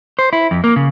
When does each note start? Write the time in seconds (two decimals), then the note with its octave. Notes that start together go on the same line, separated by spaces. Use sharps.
0.19 C5
0.33 E4
0.51 F2
0.64 A#3
0.76 C#3